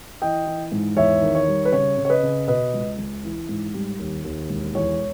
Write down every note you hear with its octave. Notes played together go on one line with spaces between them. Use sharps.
E3 D#5 G5
E3
G#2
E2 C#5 E5
D#3
C#5
G3
B4
C#3 C#5
C#3
C#5
B4 D#5
C#3
B2 B4 D#5
C#2
C#2
E3
G#2
G3
D#2
D#2
E1
E2 C#5